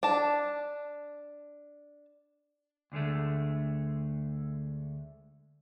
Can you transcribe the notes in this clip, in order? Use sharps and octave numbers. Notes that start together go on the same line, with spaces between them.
D4 A5
D2 D3 G#3 A3